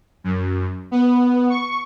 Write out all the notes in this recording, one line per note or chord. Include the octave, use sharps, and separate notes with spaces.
F#2
B3
C#6